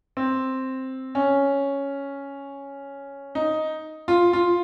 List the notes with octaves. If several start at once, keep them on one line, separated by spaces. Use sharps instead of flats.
C4
C#4
D#4
F4
F4